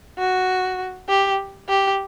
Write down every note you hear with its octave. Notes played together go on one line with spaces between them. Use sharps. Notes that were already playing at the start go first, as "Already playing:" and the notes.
F#4
G4
G4